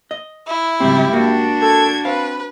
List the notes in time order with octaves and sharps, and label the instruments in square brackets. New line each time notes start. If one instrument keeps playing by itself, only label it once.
[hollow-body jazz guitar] D#5
[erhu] E4
[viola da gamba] G#2 F#3 G3 [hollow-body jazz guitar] C#3 C4 [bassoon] G4
[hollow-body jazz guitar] A#3 [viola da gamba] D4 F#4
[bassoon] A4 [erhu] G#6
[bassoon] C4 [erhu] B4 [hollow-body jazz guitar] F5